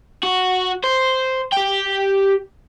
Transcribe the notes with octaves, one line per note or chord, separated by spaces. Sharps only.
F#4
C5
G4 G5